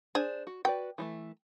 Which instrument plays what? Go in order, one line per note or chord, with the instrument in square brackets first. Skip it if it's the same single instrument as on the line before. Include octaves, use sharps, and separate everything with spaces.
[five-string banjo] D4 C5 [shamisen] G#4
[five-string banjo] F#4
[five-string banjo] F#4 B4 D5 [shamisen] G5
[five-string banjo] E3 G3 A3